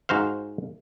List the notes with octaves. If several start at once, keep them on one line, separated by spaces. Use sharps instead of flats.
G#2 F#4 C5 F5